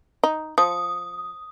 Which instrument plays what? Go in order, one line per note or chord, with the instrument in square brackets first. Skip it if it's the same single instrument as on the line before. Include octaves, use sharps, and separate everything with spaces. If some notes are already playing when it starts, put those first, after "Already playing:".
[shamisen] D#4
[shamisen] F3 [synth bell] D#6